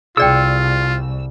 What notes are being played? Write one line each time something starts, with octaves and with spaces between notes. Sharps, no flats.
C2 F4 G#4 D5 G5 E6